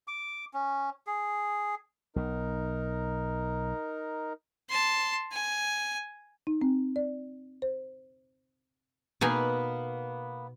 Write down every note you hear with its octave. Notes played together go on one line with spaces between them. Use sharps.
D6
C#4
G#4
B1 D#4 A#4
A5 C6
G#5
D#4
C4
D5
C5
B2 A#3 B3 D#4 B4 G#5